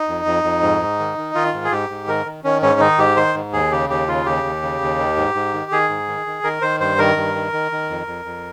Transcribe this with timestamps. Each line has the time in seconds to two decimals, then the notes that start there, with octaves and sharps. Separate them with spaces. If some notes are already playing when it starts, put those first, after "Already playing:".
Already playing: D#4
0.09 F2
0.26 F2
0.44 F2
0.62 G#2
0.81 G#2
0.99 D#3
1.18 D#3
1.35 D#3 F4
1.54 G#2
1.65 G#4
1.71 G#2 G4
1.90 G#2
2.08 D#3 A#4
2.25 D#3
2.44 D#3 C#4
2.62 G#2 C#4
2.80 D#3 D#4
2.98 G#2 G4
3.16 D#3 C5
3.35 G#2
3.53 D#2 G#4
3.71 C#3 G4
3.90 D#2 G4
4.08 C#3 F4
4.26 D#2 G4
4.44 D#2
4.62 C#3
4.81 D#2
4.99 D#3
5.16 G#2
5.34 G#2
5.54 D#3
5.71 D#3 G#4
5.89 G#2
6.08 D#3
6.26 D#3
6.43 D#3 A#4
6.62 D#3 C5
6.80 G2 C5
6.99 D#3 A#4
7.17 G2
7.35 D#3
7.53 D#3
7.72 D#3
7.90 F2
8.07 F2
8.25 F2